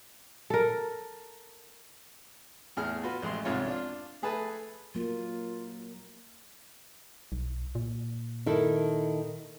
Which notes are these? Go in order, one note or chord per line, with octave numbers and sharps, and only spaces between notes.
A4 A#4
E2 A2 G#4 F6
F4 F#4 B4
A1 G#3 C6
C2 F2 G#2 F4 C#5
D4 F4
A3 G#4 B4 A5
F#3 A#3 F4
B1
A#2
D#3 E4 A4